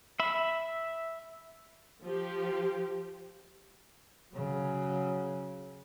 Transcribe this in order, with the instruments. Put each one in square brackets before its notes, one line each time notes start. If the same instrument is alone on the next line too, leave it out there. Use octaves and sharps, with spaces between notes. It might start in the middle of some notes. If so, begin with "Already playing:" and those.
[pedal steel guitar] E5 B5
[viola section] F3 G4
[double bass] C#3 F#3